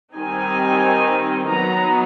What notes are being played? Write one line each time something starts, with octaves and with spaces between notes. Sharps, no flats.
D#3 G3 C4 D#4 G#5
F#3 B3 D#4 A#5